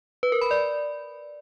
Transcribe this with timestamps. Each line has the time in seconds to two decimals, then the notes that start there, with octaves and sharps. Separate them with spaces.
0.23 B4
0.32 A#4
0.41 B5
0.51 D5